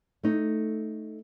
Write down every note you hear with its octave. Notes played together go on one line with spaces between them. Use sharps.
A3 D#4